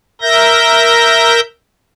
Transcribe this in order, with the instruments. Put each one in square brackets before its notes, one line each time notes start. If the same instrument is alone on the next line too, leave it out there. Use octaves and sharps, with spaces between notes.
[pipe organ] A#4 E5 G6 A#6